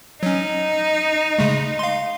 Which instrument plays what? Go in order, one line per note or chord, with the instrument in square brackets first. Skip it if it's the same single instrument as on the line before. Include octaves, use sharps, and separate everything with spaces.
[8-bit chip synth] F#3 C#4 [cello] D#4
[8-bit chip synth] C#3 G#3 A3
F5 C6